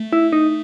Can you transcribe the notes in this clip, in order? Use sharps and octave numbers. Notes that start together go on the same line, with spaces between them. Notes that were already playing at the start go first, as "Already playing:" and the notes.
Already playing: A3
E4
D#4